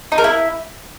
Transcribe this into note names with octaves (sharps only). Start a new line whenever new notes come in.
D#4
A#4
E4